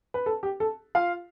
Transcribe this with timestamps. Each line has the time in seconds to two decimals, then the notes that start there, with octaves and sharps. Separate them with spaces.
0.14 B4
0.26 A4
0.43 G4
0.60 A4
0.95 F4 F5